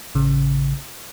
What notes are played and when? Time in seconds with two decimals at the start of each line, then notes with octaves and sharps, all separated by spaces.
0.15 A1 C#3